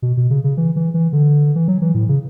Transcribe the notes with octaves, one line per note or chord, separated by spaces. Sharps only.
B2
B2
C#3
C#3
E3
E3
E3
D3
E3
F#3
E3
A2
C#3